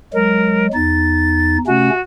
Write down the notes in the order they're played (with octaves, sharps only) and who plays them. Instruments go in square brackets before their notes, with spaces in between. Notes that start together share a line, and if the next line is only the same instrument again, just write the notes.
[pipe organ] F#3 G#3 [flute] A#4
[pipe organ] E2 D#4 [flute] A6
[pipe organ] C3 A3 C#4 [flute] F#4